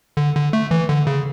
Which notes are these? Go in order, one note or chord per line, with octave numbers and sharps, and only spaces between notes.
D3
D3
A3
E3
D3
C#3